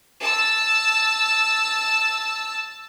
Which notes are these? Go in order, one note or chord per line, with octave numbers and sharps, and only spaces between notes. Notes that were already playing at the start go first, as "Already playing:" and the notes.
A5 E6